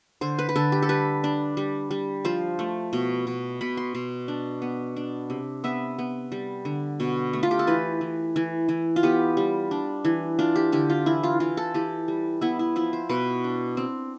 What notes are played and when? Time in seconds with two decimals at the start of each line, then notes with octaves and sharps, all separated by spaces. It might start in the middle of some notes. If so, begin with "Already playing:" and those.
0.21 D3 C5
0.39 B4
0.49 B4
0.56 D3 A4
0.72 G4
0.82 A4
0.89 G3 B4
1.24 D4
1.57 G3
1.91 G3
2.25 F3 C5
2.59 A3
2.93 B2
3.27 B2
3.61 B2 B5
3.77 C6
3.95 B2 C6
4.28 D4
4.62 B3
4.96 D4
5.30 C3
5.64 B3 E5
5.99 B3
6.32 G3
6.65 D3
7.00 B2
7.33 A3
7.43 F4
7.51 G4
7.59 A4
7.67 E3 B4
8.01 E3
8.36 E3
8.69 E3
8.96 F4
9.03 B3 G4
9.37 G3
9.71 D4
10.05 E3
10.39 D4 F4
10.56 G4
10.72 D3 G4
10.90 F4
11.06 E3 E4
11.23 F4
11.40 E3 F4
11.57 A4
11.74 E3 G4
12.08 G3
12.41 B3 E4
12.59 E4
12.76 F3 E4
12.93 C5
13.09 B2 B4
13.44 D4
13.77 C4